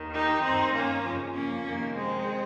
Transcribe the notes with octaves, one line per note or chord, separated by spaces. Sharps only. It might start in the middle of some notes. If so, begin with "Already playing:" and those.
Already playing: D#2 D#3
D#4 G4
G2 D#3 C4 D#4
A#3 C#4
F2 C#3 F3
A#3 C#4
F2 C3 D#3 A#3
G#3 C4